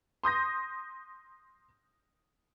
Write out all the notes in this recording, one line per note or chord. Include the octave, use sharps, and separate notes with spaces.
C6 D#6 G6 A#6